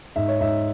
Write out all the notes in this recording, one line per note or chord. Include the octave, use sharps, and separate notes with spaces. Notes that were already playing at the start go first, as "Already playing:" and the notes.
G#2 E5
C#5
G#2 E5